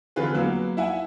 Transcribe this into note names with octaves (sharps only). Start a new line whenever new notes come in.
D3 E3 C4 F4 G#4 B4
F#3 A#3 B3
E4 E5 F#5 G#5